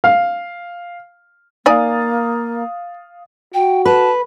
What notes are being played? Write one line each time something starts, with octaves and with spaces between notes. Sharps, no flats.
F5
A#3 D#4 D5 F5 G#5 D#6 A6
F#4 G5
B4 A5